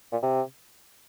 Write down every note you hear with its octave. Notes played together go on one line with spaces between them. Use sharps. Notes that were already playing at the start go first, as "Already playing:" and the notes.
A#2
C3